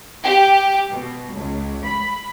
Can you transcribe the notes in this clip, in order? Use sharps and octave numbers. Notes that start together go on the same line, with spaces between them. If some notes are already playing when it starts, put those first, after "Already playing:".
G4
B2
C#2
B5